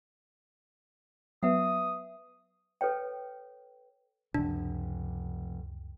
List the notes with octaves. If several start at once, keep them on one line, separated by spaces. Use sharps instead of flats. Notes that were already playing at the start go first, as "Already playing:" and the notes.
F#3 B3 B4 E5 F#5 D#6
A4 B4 C#5 G5
C#2 F#2 C3 F3 D4